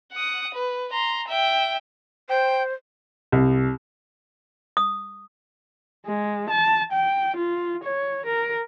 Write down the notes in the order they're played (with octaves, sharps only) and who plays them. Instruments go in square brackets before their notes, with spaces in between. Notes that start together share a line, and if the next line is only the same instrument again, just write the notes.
[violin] F#5 D#6
B4
A#5 C6
E5 G5
[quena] C5 [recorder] G5
[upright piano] C2
[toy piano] D#6
[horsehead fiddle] G#3
A5
G5
F4
C#5
A#4